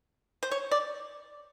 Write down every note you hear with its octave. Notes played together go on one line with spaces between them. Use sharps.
C5
C#5
D5